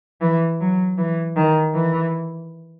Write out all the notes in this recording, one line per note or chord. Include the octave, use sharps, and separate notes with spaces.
E3
F#3
E3
D#3
E3